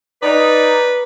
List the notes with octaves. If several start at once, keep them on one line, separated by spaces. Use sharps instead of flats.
D#4 B4 D5